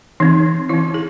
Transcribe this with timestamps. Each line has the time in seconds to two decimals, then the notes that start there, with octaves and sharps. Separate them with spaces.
0.20 E3 C4 D#4
0.69 E3 C4 E4
0.94 G#4